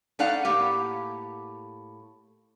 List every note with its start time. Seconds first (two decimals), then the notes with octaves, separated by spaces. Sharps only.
0.19 A3 D#4 D5 F5 F#5
0.45 A2 A#3 G4